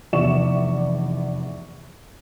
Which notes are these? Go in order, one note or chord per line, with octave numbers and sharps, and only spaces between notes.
F1 E2 D5 E5 C#6 E7